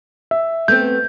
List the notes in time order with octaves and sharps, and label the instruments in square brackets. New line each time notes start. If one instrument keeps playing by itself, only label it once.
[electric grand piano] E5
[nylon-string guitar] A3 B3 C4 [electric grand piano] G6